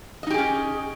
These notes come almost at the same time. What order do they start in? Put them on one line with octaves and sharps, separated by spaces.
D#5 D#4 G4 G#4 C#4